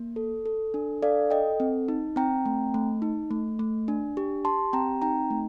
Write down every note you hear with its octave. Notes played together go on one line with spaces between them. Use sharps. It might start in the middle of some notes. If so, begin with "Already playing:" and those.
Already playing: A#3
A4
A4
D4
A4 D5 F5
A4 D#5 G5
C4
D#4
C4 G5 A#5
A3
A3
D#4
A3
A3
D4
G4
G4 A5 C6
C4 G5 A#5
D#4 G5 A#5
A3